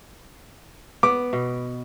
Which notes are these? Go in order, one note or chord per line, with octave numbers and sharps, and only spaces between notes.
B3 D6
B2